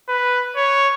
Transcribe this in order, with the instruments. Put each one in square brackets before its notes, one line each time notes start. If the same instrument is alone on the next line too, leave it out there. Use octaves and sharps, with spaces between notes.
[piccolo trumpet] B4
C#5